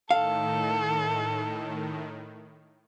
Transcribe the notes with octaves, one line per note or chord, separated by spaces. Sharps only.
A2 D#3 A4 F5